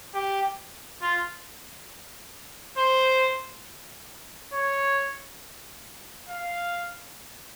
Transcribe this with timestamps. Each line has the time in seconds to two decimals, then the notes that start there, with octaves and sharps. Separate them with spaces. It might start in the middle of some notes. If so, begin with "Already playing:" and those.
0.15 G4
1.02 F4
2.78 C5
4.53 C#5
6.29 F5